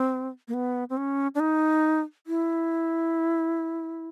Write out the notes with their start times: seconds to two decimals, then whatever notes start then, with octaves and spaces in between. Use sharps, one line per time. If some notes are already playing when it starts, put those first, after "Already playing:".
Already playing: C4
0.48 A#3
0.54 B3
0.90 C4
0.97 C#4
1.35 D4
1.40 D#4
2.27 E4